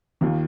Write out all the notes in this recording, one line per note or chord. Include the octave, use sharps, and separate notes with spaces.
D#2 D#3 A#3 F4